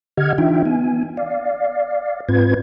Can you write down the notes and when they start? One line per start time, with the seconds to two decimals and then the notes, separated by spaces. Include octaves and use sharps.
0.17 D3 G4 D#5 F#5 F6 G#6
0.38 E3 D4 D#4 F4 E5 G5
0.65 B3 G#5
1.17 D5 F5
2.29 G#2 C4 F4 B4 G#6